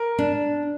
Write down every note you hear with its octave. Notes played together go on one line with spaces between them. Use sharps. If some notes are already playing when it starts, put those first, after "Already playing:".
Already playing: A#4
D4